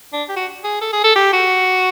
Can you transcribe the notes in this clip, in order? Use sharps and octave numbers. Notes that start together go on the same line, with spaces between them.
D4
G4
F#4
G#4
A4
G#4
A4
G4
F#4